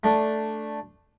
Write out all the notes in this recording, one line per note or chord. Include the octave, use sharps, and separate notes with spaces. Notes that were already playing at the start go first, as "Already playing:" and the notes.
A3 D4